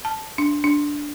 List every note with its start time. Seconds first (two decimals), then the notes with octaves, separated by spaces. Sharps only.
0.05 A5
0.38 D4
0.64 D4